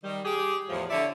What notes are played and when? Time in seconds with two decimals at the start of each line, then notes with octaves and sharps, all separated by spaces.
0.04 D#3 G3
0.25 G4 G#4
0.69 E2 A2 F3
0.90 D3 E4 C#5 D5 E5